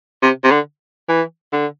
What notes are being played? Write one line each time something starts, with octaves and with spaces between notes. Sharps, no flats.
C3
C3
D3
E3
D3